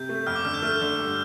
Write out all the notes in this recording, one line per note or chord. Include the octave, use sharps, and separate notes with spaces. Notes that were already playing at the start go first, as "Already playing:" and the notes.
Already playing: C3 G6
A3
F2 F6
D6
D3 F6
G6
A3 F6
D3
G2